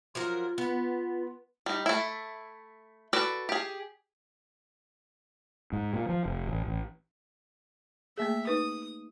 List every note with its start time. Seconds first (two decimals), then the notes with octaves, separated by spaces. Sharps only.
0.15 F3 F#3 F4 A#4
0.58 B3
1.66 G3 D#4
1.86 A3 E4
3.13 F#4 A4 B4 D5
3.49 G4 G#4
5.73 G#2
5.94 A#2
6.09 F3
6.26 F1
6.47 A1
6.67 A1
8.18 A3 A#3 G#4 E5
8.47 D#4 B4 D#6